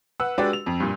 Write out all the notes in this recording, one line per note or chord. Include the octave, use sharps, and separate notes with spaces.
B4 F#5 E6
G#3 D4 F#4 G4 B4 D5
F7
F2
G2 A#2